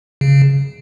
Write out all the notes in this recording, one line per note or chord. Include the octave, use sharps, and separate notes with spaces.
C#3